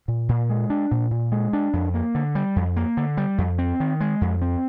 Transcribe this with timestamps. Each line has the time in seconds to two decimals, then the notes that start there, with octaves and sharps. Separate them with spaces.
0.08 A#2
0.29 A#2
0.50 G#3
0.70 D4
0.91 A#2
1.11 A#2
1.32 G#3
1.53 D4
1.73 F2
1.94 A#3
2.15 D3
2.35 G3
2.56 F2
2.77 A#3
2.97 D3
3.17 G3
3.38 F2
3.59 C4
3.80 D#3
4.01 G#3
4.21 F2
4.42 C4